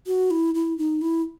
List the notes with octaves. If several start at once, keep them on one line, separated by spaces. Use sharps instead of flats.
F#4
E4
E4
D#4
E4